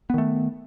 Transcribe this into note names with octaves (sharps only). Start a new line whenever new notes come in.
D#3 A3 B3